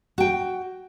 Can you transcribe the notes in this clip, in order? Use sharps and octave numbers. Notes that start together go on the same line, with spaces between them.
F#4 G5